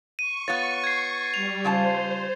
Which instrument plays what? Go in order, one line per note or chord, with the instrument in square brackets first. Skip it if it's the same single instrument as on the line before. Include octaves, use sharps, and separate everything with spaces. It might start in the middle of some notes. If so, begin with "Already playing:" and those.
[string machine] C#6 [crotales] D#7
[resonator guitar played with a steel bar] B3 F4 C#5 [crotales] A6
[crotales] G#6 C7
[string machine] G3 [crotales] F7
[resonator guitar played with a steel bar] C#3 F4 A5 [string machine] C5